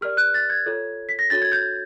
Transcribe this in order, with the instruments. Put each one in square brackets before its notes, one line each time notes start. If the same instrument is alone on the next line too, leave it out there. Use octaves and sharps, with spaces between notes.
[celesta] G4 A#4 D5 F6
F#6
A6
G#6
F4 A4 C#5
B6
A#6
D4 F#4 A4 C#5 A6
G#6
G6